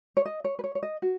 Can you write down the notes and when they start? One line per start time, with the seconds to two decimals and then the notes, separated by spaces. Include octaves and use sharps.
0.17 C#5
0.25 D#5
0.44 C#5
0.59 B4
0.64 C#5
0.75 C#5
0.83 D#5
1.02 F#4